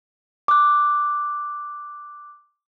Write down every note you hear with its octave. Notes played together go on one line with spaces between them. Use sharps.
D6 F#6